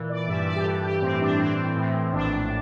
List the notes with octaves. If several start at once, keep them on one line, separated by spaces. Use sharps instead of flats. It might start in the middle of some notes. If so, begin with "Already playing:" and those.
Already playing: A#2 E3
D5
G2 E5
D5
G4
E3 A4
G4
A2 C4
D4
E3 C4
A2
A#1 D4